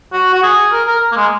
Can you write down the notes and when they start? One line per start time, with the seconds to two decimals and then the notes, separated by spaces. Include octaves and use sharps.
0.13 F#4
0.34 F#4
0.43 G#4
0.72 A#4
0.87 A#4
1.12 A#3
1.16 G#3